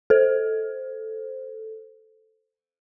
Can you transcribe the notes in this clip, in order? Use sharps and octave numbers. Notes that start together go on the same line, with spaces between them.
A4 C5